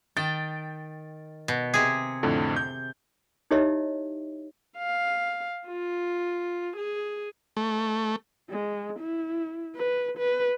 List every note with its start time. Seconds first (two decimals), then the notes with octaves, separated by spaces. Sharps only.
0.17 D#3 G5 A6
1.48 B2
1.74 C3 G#4
2.23 F2 A2 D3
2.56 G6
3.51 D#4 E4 G4 C#5 D#5 E5
4.77 F5
5.67 F4
6.77 G#4
7.57 A3
8.50 G#3
9.00 E4
9.76 B4
10.18 B4